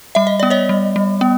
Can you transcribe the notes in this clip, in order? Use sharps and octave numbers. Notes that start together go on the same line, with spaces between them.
G3 E5
D#5
B3 D5
C#5 D#5
G3
G3
B3